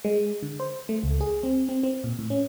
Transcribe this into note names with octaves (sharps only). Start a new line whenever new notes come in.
G#3
D3
C5
A3
C#2
G#4
C4
C4
C4
A#2
A2
C#4